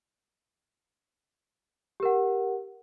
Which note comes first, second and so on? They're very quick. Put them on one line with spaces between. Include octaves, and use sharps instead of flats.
G4 A#4 F#5